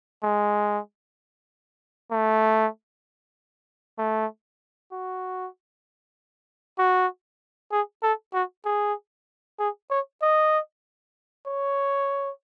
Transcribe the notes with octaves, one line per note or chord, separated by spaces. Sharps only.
G#3
A3
A3
F#4
F#4
G#4
A4
F#4
G#4
G#4
C#5
D#5
C#5